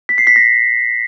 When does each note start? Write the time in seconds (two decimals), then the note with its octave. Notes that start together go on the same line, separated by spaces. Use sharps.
0.09 B6
0.18 C7
0.27 B6
0.36 A#6